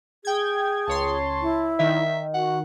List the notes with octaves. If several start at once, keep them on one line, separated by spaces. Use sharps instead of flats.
G#4 G5 G#6
C#2 C#5 A5 C6
E4
D#3 E5
F#4 F#5